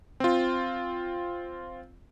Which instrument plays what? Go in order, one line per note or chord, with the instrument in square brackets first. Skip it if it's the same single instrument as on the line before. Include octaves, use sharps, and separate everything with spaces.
[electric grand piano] C4 F4